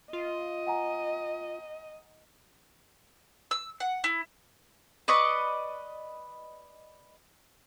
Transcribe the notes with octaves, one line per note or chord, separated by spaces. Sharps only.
F4 D#5
F#5 G#5 A#5
E6
F#5
E4
B4 D5 D#5 C#6